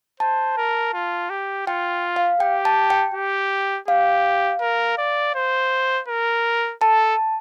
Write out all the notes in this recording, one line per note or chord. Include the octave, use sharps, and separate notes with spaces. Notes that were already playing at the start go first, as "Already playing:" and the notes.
C5 A5
A#4
F4
G4
F4 G5
F5
G4 G5
A5
G5
G4
G4 F5
A#4
D5
C5
A#4
A4 A5